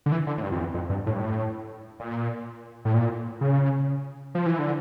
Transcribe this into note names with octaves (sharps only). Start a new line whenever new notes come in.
D3
E3
D3
A2
G2
F2
E2
F2
G2
A2
G2
A2
A#2
A2
A#2
C#3
F3
E3
D3